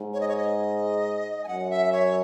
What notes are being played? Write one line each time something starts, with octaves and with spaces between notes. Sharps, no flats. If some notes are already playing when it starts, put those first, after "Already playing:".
Already playing: G#2
C#5
D#5
C#5
D#5
G#5
F#2 F#5
E5
C#5